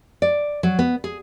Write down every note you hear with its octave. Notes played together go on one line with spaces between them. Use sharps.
D5
F#3
B3
G#4